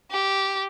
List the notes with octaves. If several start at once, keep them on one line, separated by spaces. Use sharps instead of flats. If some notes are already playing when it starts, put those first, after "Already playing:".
G4